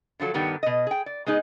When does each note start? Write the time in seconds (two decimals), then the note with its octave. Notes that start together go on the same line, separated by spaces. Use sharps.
0.20 D3 F3 F#3 A4
0.34 G2 D#3 G3 B3 G4
0.63 B2 D#5
0.87 G#4 G5
1.06 D5
1.26 G#3 B3 D#4 G#4